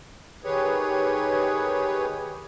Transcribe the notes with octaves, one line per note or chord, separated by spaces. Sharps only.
D#3 G4 G#4 B4 C#5